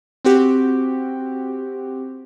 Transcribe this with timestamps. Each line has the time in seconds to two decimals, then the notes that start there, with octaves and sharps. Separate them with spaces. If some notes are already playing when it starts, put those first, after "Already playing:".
0.25 C4 F#4 G4